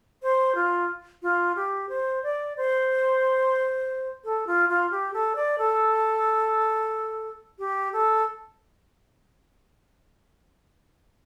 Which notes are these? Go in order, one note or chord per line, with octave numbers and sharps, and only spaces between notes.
C5
F4
F4
G4
C5
D5
C5
A4
F4
F4
G4
A4
D5
A4
G4
A4